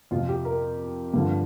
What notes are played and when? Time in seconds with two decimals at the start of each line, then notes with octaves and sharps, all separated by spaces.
0.11 F2 C3 F3 F4
0.29 G4
0.45 A#4
1.14 G2 D3 F3